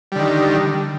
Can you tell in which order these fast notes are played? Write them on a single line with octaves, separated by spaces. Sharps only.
G3 D3 D#3